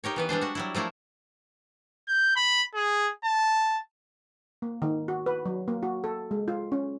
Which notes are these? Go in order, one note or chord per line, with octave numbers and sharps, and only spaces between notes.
D#4 G4 A#4 C#5
E3 B3 B4
G3 G#3 D4 C5
F#4 F#5
F#3 G3 E4
F3 A3 A#3 E4
G6
B5
G#4
A5
A#3
D#3
F#4
B4
F#3
A#3
F#4
A4
G#3
F4
C#4